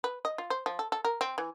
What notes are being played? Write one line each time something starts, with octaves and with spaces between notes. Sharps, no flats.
B4
D#5
F4
C5
F3
A4
A4
A#4
C4
E3